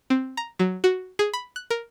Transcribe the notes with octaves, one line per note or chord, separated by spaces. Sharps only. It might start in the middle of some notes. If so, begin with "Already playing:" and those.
C4
A#5
F#3
F#4
G#4
B5
F#6
A#4